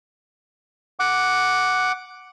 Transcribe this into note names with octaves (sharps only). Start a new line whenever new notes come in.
F#5 D6